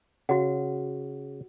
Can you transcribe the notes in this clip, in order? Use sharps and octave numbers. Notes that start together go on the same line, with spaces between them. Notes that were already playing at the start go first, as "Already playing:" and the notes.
C#3 F#4 F#5